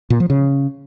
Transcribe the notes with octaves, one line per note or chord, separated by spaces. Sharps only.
A#2
F3
C#3